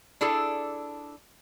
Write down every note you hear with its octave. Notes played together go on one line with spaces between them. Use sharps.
D4 E4 G#4 A4